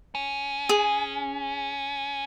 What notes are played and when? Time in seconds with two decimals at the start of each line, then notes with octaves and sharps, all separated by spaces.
0.15 C#4
0.69 G#4